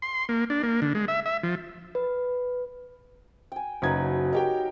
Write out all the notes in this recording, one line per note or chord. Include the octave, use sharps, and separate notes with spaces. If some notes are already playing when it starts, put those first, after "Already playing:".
C6
A#3
D4
A#3
D3
G#3
E5
E5
F3
B4
G5 G#5
F#1 F#3 D#4 B4 G#6
D#4 G4 A#4 C#5 G5